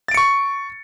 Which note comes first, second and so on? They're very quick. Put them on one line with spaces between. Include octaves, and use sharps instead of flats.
A6 D7 C#7 C#6